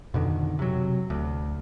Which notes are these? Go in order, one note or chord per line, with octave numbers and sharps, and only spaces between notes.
F2 B2 D3 D#3
C3 F#3
D2